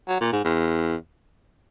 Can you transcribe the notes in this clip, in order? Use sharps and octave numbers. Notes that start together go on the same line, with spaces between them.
F#3
A#2
G#2
E2